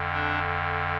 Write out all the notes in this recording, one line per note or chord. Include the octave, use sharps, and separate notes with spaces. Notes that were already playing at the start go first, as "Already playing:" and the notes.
Already playing: F2 D3
D4